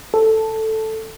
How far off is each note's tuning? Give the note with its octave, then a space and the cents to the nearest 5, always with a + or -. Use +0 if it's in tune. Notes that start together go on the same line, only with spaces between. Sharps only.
A4 +0